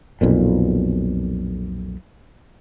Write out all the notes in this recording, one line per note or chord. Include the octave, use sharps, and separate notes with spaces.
B1 F2 A#2